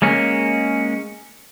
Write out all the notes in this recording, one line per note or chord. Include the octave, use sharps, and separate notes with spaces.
G#3 A#3 C#4